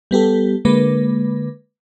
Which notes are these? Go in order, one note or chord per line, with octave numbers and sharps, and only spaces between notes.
G3 B3 G4 A4
D3 G#3 A#3 B4